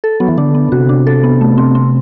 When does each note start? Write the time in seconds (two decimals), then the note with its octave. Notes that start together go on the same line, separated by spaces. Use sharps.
0.04 A4
0.20 F#3 B3
0.28 E3
0.38 D3 D4
0.55 B3
0.72 C3 F#4
0.89 D4
1.07 A4
1.24 B3
1.41 A3
1.58 C4
1.75 C4